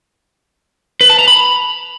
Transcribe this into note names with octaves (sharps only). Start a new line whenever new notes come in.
B4
A5
A#5
B5